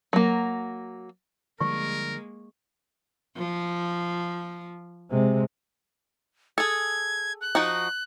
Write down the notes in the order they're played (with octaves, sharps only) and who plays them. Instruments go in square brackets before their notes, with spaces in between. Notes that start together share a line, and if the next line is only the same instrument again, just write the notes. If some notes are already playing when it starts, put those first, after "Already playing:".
[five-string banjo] F#3 A#3
[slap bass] D3 F3 G3 [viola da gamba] G#3 A#3 [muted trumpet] A#4 [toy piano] C#6
[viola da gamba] F3
[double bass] C3 G#3
[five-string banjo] G#4 A4 [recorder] G#6
[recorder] F#6
[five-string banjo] F3 D#4 F#4